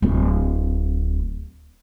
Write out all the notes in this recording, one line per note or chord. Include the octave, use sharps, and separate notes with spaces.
D1 C4